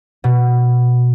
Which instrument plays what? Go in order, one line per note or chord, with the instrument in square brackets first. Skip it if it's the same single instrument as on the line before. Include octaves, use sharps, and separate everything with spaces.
[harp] B2